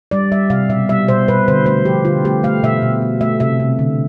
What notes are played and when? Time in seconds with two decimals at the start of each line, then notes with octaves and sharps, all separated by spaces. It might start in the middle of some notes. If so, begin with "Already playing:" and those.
0.11 G3 D5
0.32 G3 E5
0.50 C3 F5
0.69 B2 E5
0.89 G3 E5
1.08 B2 C5
1.28 B2 B4
1.48 D3 C5
1.66 A3 C5
1.85 F3 G4
2.05 D3 F4
2.24 A3 G4
2.43 A3 F5
2.63 B2 E5
2.82 B2
3.02 A3
3.21 A3 E5
3.40 C3 E5
3.60 C3
3.79 D3